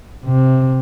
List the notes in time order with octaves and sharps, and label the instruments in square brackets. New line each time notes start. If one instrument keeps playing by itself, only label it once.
[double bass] C3